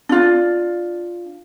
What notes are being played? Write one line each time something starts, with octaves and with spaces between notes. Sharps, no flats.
D4 F4